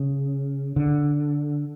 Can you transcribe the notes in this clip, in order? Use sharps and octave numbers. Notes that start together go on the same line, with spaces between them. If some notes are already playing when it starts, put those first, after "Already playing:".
Already playing: C#3
D3